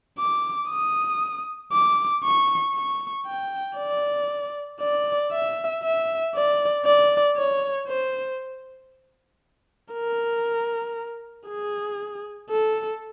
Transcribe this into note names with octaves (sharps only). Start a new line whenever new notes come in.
D6
D#6
D6
C#6
C#6
G5
D5
D5
E5
E5
D5
D5
C#5
C5
A#4
G#4
A4